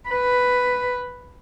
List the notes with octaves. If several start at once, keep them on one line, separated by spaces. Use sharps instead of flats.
B4